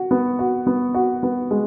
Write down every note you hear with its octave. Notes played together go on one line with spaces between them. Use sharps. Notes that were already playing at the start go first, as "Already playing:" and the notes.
Already playing: F#4
B3
F#4
B3
F#4
B3
G#3